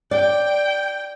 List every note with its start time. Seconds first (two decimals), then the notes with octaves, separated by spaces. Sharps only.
0.11 D5 G5